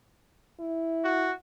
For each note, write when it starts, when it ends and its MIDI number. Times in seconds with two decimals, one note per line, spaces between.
0.60 1.31 64
1.04 1.32 66